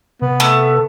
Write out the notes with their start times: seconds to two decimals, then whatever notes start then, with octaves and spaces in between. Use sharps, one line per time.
0.22 C3 B3
0.40 A3